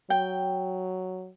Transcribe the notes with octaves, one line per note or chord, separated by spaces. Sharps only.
F#3 G5